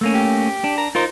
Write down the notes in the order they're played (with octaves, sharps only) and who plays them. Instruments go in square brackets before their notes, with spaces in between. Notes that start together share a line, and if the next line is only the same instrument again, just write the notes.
[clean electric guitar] A3 A#3 C#4
[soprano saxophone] G4
[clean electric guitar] D4
[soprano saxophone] A#5
[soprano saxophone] D#4 [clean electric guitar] F4 A#4 C5